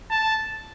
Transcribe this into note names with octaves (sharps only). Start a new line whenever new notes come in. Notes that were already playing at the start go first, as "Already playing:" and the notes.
A5